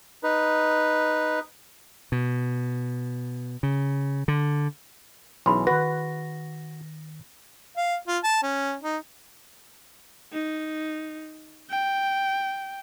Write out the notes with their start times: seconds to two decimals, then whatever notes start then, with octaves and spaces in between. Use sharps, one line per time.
0.23 D#4 B4
2.12 B2
3.63 C#3
4.28 D3
5.46 B1 E3 C#4 G#4 B5 C6
5.67 D#3 F#4 B4 A#6
7.77 F5
8.07 F4
8.23 A5
8.42 C#4
8.82 D#4
10.33 D#4
11.70 G5